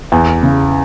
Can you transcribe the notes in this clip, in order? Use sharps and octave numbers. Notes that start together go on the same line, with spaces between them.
E2
C#3